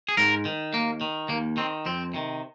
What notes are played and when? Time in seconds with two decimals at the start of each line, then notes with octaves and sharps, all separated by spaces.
0.09 G#4
0.17 G#2 A#4
0.45 D#3
0.73 D#2 A#3
1.01 D#3
1.29 D#2 A#3
1.57 D#3 C4
1.86 F2 C4
2.14 C3 D#3